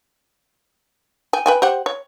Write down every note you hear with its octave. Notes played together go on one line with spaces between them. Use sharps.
G5 G#5
B4 G5 G#5
G4 C5 F#5
C#5